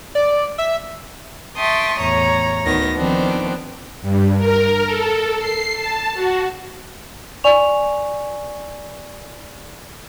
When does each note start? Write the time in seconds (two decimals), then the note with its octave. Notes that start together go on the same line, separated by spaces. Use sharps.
0.15 D5
0.58 E5
1.56 E5 G5 A5 C6 C#6 D#6
2.01 E2 A2 C#5 A#5
2.65 D2 D#3 B3 A#6
2.96 D#3 F3 B3 C4 D4
4.02 G2
4.37 A#4
4.85 A4
5.39 C7
5.76 A5
6.14 F#4
7.44 D5 G#5 C#6 F7